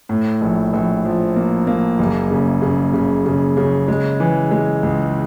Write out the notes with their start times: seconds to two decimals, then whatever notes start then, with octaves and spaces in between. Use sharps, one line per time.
0.09 A2
0.41 A#1
0.73 A#1
1.05 F3
1.36 A#3
1.67 A#3
1.99 F#1
2.31 C#3
2.62 C#3
2.93 C#3
3.26 C#3
3.57 C#3
3.88 G#3
4.20 E3
4.51 G#3
4.83 C#2